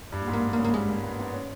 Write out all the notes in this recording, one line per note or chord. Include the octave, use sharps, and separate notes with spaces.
G2
A#2
G#2
A#3
A#3
C#3
A#3
G3 G#3
A#3
B3
B3
C#4